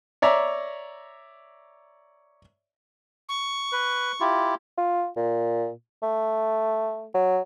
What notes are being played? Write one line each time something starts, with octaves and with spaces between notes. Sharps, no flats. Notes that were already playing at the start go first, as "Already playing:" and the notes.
C#5 D5 E5 A#5
C#6
B4
E4 F4 G4
F4
A#2
A3
F#3